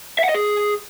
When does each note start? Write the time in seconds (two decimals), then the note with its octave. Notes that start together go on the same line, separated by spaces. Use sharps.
0.19 E5
0.24 F#5
0.29 D#5
0.34 G#4